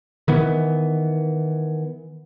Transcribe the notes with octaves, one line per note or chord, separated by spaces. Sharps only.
D#3 E3 B3